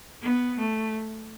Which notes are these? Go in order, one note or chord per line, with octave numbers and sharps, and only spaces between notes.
B3
A3